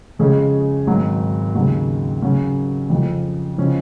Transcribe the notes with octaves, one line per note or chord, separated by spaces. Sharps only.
F2 C#3 G#3 C#4 G#4
G#1 G#2 F#3
D#2 C#3 F#3
C#3 F#3 C#4 F#4
F2 C#3 F3
C#3 F3 G#3 C#4